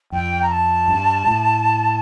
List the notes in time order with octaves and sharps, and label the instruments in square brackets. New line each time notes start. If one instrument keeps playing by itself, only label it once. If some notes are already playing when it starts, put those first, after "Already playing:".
[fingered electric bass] F2 [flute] G5
[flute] A#5
A5
[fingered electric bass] G2
A2